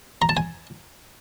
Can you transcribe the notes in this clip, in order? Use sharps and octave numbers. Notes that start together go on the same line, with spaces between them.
A#5
A5
G#5